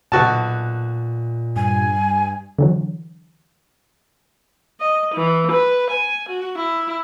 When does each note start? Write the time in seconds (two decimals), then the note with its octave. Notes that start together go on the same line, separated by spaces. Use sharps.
0.12 B1 A#2 F#4 A5
1.56 G2 G#5
2.58 D3 E3 F#3
4.80 D#5
5.14 E3
5.51 B4
5.90 G#5
6.29 F#4
6.58 E4